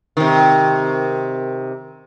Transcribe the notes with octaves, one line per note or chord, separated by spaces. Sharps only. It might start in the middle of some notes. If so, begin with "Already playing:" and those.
C3 D#3